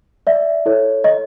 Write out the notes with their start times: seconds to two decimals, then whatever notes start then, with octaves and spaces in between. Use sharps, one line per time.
0.27 D5 E5
0.66 E4 A4 C#5
1.04 D#5